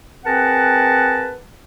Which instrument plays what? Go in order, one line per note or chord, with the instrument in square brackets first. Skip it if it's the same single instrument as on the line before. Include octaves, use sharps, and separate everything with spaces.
[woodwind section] C4 G#4 A#4 B4 F#5 A5